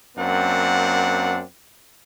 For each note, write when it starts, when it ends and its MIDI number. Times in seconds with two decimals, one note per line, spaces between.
0.17 1.42 42
0.17 1.42 58
0.17 1.42 60
0.17 1.42 62
0.17 1.42 78